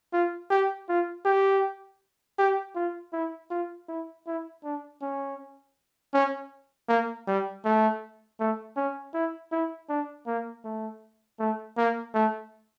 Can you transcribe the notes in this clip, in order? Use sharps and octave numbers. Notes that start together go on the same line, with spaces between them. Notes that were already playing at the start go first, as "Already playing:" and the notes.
F4
G4
F4
G4
G4
F4
E4
F4
E4
E4
D4
C#4
C#4
A#3
G3
A3
A3
C#4
E4
E4
D4
A#3
A3
A3
A#3
A3